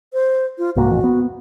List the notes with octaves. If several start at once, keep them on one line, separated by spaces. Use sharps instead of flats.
C5
F4
C2 G#2 A#3 F#4
A1 F2
B3